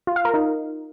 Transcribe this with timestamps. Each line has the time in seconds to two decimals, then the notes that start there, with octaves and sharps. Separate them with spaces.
0.07 F4
0.16 F5
0.25 A#4
0.34 D#4